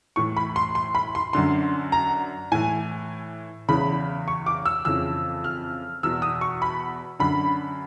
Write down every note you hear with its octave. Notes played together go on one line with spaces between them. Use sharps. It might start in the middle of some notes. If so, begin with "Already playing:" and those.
A2 E3 C#6
B5
C6
C6
B5
C6
F#2 D3 C6
A#5
A2 E3 G#5
E2 C#3 E3 B5
C#6
D6
E6
F2 C#3 E3 E6
F6
E2 B2 E6
D#6
C#6
B5
F#2 D3 B5